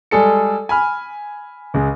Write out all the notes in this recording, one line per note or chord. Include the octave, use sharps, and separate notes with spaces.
G3 G#3 G#4 A4 C#7
G#5 B5 F6
C#2 G#3